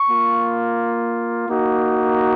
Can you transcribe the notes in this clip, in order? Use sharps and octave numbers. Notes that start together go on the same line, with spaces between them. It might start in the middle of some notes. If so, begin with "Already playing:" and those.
Already playing: C#6
A#3 F4
A#3 D#4 F#4